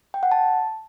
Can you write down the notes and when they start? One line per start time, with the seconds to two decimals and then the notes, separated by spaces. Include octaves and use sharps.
0.14 G5
0.23 F#5
0.31 A5